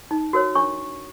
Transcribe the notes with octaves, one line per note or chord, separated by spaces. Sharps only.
D#4
F#4 A#4 C#5
D4 C#6